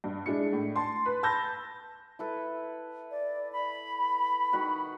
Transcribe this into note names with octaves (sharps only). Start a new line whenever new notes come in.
G2
G#3 D4 E4 C#7
A2
A5 C6
B4
A5 B5 E6 G6 A#6
E4 A4 B4
D5
B5
D#3 F#4 F#5